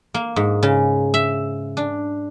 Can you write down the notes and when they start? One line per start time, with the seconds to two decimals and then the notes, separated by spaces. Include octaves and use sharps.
0.14 A#3
0.36 G#2
0.63 C#3
1.14 E5
1.77 D4